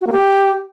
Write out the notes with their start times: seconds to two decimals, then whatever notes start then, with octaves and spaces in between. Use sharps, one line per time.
0.01 F#4
0.07 A#3
0.12 G4